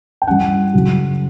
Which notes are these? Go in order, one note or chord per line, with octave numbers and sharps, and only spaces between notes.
G5
G2 E3 G3 C#4 F#5
F#2 C#3 F#3